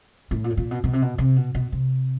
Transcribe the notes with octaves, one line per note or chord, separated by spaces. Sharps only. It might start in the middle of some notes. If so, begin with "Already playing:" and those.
A2
A#2
A2
A#2
B2
B2
C3
B2
C3
B2
B2
C3